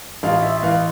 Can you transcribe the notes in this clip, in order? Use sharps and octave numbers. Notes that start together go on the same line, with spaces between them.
A1 F5
E5
E3 F5